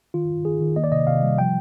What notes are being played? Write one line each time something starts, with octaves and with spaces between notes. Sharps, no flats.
D#3 F4
D#3
D#3 G#4
D#3
A#3 D#5
D5
C3 D#5
C3 F5
G3
F3 G5